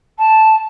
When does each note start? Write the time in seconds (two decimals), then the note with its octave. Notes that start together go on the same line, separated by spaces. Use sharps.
0.18 A5